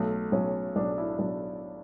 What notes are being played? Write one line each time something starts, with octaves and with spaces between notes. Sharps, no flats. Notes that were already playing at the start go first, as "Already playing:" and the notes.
Already playing: B1 A3
B1 C#4
B1 D4
E4
B1 D4